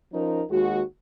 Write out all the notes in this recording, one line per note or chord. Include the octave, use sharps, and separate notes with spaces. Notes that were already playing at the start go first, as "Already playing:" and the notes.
F3 C#4 D#4 A#4
D#2 G#3 F#4